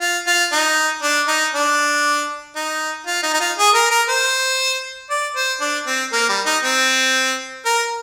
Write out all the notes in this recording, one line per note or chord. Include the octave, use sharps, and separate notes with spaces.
F4
F4
D#4
D4
D#4
D4
D#4
F4
D#4
D#4
F4
G#4
A#4
A#4
C5
D5
C5
D4
C4
A#3
G3
D#4
C4
A#4